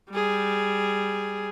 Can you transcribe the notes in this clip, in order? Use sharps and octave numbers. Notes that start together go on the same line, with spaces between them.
G3 G#4